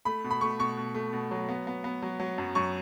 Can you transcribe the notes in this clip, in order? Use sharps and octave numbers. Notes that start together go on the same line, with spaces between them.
A3 B5
B2
B5
A3 C#6
B2 C#6
B2
A3
B2
F#3
B3
B3
B3
F#3
F#3
F#2
F#2 C#6